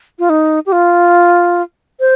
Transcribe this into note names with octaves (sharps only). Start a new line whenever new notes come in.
F4
D#4
G4
F4
C5